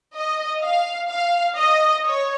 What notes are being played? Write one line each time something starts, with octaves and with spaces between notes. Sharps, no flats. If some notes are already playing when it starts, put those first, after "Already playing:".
D#5
F5
F5
D#5
C#5